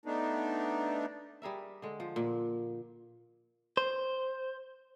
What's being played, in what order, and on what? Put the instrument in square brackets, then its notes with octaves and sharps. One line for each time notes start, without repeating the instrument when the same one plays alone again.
[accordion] A3 B3 D4 D#4
[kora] G3 G#4 A#4 E5
D3 G#3
F3
A#2
[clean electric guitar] C5